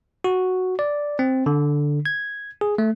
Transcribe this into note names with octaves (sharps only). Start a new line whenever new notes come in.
F#4
D5
C4
D3
G#6
G#4
A3